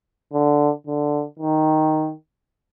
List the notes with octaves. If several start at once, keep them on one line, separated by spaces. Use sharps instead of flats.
D3
D3
D#3